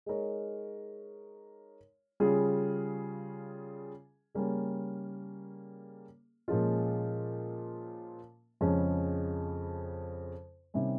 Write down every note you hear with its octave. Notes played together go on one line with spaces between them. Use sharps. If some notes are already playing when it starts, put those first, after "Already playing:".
G#3 D#4 A#4 C#5
C#3 G3 C#4 F4 G#4
C#3 G3 A#3 C#4 G#4
A#2 F3 G#3 C#4 F4
F2 C#3 F3 G#3 C#4
C3 D#3 G3 C#4